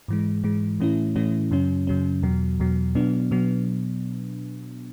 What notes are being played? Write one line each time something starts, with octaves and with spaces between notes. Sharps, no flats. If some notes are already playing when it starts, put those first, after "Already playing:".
G#2 E3 G#3
G#2 E3 G#3
A2 E3 A3 C#4 E4
A2 E3 A3 C#4 E4
F#2 C#3 F#3 C#4
F#2 C#3 F#3 C#4
E2 B2 F#3
E2 B2 F#3
B2 F#3 B3 D4
B2 F#3 B3